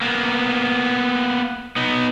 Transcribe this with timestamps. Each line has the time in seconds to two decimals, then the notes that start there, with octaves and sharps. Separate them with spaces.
0.01 A#3 B3
1.76 B3 D#4